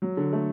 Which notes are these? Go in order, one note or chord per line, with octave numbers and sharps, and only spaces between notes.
F#3
D3
A3